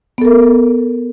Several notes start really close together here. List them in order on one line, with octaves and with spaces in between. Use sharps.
B3 A4 A#4